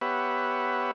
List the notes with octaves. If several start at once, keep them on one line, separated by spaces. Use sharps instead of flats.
B3 G4 B4 C#5 E5 F#5